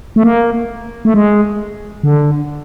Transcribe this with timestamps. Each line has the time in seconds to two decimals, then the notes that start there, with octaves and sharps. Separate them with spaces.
0.16 A3
0.23 A#3
1.05 A3
1.14 G#3
2.03 D3